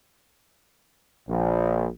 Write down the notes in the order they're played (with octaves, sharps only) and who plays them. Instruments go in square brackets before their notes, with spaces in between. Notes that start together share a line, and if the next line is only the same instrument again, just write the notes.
[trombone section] A#1